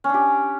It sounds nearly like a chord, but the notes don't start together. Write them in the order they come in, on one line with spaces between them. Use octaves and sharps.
C#4 D4 G4